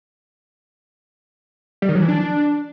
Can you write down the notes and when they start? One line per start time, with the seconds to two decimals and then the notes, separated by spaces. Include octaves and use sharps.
1.82 G3
1.89 D#3
1.95 F#3
2.02 E3
2.08 D4